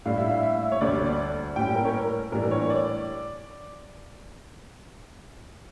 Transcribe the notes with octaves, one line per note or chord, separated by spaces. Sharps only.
A2 G3 D4 F5
E5
F5
E5
C#5
D2 D3 G3 D5
D5
A2 G3 C#4 G5
A#4
C#5
A#4
A2 E3 G3 D4 A#4
C#5
C#5
D5